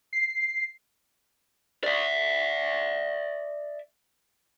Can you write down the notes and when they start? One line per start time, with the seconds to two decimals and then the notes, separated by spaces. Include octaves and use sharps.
0.13 C7
1.84 D5 E5